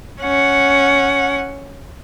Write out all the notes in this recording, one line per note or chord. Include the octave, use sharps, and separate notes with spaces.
C#4 F#5